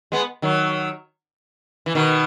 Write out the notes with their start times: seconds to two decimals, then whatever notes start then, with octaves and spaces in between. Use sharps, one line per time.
0.12 G#3 B3
0.42 D#3 F#3
1.86 E3
1.95 B2 D#3